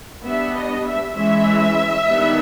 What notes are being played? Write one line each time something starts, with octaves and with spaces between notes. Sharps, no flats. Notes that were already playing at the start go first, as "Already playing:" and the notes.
G3 B3 D4 E5
D#5
E5
E3 G#3 C#4 E5
D#3 G3 B3 D4